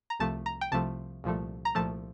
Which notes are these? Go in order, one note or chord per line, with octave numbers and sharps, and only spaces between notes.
A#5
C2 C3 F3 A3 A5
A#5
G5
C2 C3 F3 A3 A5
C2 A#2 F3 A3
A#5
C2 A#2 F3 A3 A5